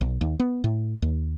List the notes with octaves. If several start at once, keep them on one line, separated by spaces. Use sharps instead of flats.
B1
D#2
B3
A2
D#2